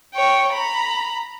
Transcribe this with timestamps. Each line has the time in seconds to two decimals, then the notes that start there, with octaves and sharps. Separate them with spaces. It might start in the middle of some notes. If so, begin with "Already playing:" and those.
0.14 C#5 G5
0.52 A#5 B5